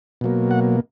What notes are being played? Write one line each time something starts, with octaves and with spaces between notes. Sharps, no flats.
B2 F#3 A#3
F#5